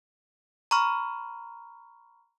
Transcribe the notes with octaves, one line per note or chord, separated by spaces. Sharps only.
A#5 B5 C#6 F6